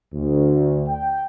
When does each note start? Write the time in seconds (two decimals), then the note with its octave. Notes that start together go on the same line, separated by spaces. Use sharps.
0.14 D2
0.88 G5